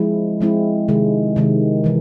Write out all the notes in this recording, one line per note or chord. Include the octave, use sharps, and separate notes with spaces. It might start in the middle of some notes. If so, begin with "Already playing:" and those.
Already playing: F3 G#3 C4 E4
F3 G#3 C4 E4
C3 D#3 G#3
C3 D#3 G#3
C3 E3